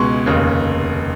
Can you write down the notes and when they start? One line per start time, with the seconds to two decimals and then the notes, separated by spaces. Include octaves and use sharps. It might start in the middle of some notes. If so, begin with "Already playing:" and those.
Already playing: C#2 B2 G#3 B3 C6 C#6
0.26 F1 D#2 C#3